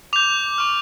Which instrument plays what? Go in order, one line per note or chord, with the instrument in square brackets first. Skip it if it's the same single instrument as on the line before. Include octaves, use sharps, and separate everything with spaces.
[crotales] D6 G6 F7
C#6 F6